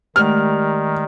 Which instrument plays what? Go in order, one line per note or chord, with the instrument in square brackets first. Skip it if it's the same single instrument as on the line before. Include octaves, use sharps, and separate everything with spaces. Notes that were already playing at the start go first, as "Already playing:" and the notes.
[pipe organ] D#3 [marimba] G#3 A3 F#5 [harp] G4 D5 [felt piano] F6